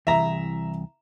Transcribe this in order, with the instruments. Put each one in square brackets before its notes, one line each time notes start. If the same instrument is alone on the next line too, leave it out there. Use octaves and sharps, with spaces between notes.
[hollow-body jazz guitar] C2 E3 [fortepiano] E5 A#5